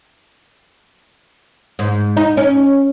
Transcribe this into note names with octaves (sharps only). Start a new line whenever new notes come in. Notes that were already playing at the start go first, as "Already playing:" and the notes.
G#2
D#4
C#4